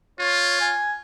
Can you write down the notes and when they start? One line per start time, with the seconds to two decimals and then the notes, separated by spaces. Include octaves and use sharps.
0.20 F4 C#5
0.60 G#5